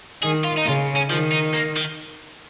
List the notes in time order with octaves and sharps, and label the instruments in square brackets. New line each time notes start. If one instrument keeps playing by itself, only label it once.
[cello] D#3 [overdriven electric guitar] G#4
[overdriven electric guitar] F4
D#4
[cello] C#3 [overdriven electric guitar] F4
[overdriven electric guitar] C#4
[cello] D#3 [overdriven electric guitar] F3
[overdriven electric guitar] D#4
A#3
D#3